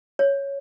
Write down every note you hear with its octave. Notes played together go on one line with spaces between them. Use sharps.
C#5